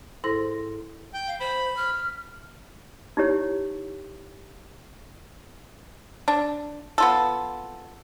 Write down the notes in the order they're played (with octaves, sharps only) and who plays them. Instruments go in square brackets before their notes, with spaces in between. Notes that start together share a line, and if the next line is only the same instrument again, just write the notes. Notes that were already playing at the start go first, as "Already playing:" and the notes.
[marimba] G#2 E4 A4 C5 C6 A#6
[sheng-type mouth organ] G5
[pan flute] F5
[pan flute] C5 [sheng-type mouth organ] B5
[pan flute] F6
[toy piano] D#4 E4 G4 C#5
[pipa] D4
B3 F4 A4